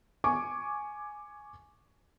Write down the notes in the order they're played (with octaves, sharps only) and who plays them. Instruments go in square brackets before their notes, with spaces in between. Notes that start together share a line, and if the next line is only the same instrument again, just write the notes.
[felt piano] G#5 C#6 D6